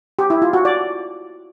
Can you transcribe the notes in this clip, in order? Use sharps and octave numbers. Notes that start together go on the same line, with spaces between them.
G4
E4
F4
F#4
D5